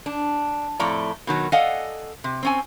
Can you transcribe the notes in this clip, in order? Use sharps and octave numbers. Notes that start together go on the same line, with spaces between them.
D4
F2 A2 A3 D5 A#5
B2 D#3 F#3
A4 D5 D#5 F5 F#5 G#5
C3
C4 C#4 G#5